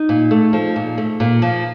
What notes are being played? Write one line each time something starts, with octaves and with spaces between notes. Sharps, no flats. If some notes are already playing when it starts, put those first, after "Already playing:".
Already playing: D#4
A#2
A3
F3
A#2
A3
A#2
F3